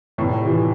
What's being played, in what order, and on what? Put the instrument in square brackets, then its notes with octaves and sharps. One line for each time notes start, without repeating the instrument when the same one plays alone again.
[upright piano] F1 [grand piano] A2
[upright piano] F2 C3 E3